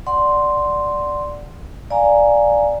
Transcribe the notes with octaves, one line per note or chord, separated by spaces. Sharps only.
D5 F#5 C6
D5 F5 G#5 A#5